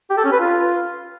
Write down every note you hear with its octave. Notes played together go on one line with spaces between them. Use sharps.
G4
A4
C#4
B4
F4